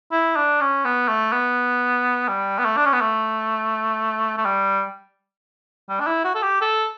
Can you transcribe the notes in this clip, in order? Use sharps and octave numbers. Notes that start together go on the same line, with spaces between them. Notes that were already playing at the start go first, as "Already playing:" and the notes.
E4
D4
C#4
B3
A3
B3
G3
B3
A3
D4
C#4
B3
A3
A3
G3
G3
D4
E4
F#4
A4
G4
A4